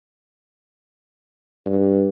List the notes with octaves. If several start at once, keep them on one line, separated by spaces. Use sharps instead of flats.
G2